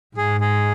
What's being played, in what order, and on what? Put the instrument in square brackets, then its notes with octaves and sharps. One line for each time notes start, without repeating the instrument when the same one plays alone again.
[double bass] G#2 [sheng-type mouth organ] G#4
[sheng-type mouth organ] G#4